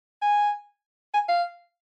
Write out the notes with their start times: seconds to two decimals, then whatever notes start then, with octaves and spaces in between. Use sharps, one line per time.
0.22 G#5
1.14 G#5
1.29 F5